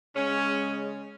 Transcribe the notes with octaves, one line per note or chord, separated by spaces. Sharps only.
C#3 G#3 C#4